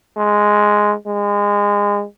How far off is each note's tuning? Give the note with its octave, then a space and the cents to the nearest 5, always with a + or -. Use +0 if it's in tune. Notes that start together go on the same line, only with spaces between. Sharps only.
G#3 +0
G#3 -25